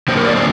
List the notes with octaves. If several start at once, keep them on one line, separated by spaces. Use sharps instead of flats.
D3 F#3 A#3 C5
A#4
D5
C5